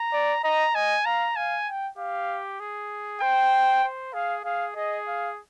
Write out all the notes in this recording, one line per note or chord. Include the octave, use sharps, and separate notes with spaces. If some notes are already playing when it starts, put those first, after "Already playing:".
Already playing: A#5
D5
D#5 A#5
D#5 G#5
F5 A#5
F5 G#5
G5
G4 F5
G#4
C5 G5
C5
G#4 F5
G#4 F5
G#4 D#5
F5